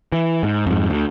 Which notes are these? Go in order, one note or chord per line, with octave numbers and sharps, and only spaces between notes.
E3
G#2
F2 G#2
D2